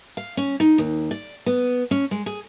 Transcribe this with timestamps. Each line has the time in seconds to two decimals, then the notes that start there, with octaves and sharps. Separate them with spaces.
0.17 F5
0.37 C#4
0.60 D#4
0.78 D#2
1.11 D5
1.46 B3
1.91 C#4
2.11 G#3
2.26 G#4